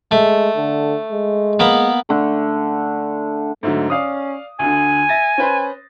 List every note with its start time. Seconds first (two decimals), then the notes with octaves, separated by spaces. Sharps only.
0.11 G#3 A3
0.57 D3
1.12 G#3
1.60 A#3 B3
2.09 D3 A3
3.63 G#2 D3 F#3 A3
3.90 C#4 D5 F5 D#6
4.59 D2 D3 G#5
5.09 E5 A6 A#6
5.38 C#4 B4 C5